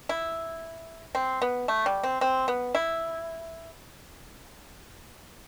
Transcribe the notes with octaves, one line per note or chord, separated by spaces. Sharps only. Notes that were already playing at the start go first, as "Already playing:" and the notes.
E4
C4
B3
A3
G3
C4
C4
B3
E4